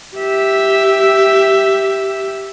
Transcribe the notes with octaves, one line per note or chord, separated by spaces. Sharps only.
G4 E5